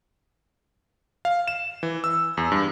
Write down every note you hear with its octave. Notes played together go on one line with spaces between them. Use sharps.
F5
E7
E3
E6
E2
G2